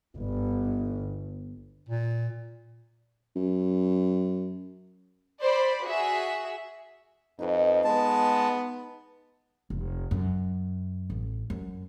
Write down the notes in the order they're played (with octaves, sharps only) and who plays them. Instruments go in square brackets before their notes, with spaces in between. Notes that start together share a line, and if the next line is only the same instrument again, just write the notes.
[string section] G1
[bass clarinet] A#2
[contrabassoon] F#2
[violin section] C5 D5 B5
F#4 G#4 E5
[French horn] F2 [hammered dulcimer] D#4 B4 D#5
[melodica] G#3 A5 [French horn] B3
[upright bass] F1
F#2
A1
F#2